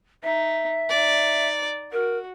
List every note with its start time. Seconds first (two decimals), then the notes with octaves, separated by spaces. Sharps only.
0.23 D#4 E5
0.89 D#4 D5
1.92 F#4 A#4